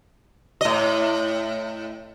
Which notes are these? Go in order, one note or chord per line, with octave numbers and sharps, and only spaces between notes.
A2 D#5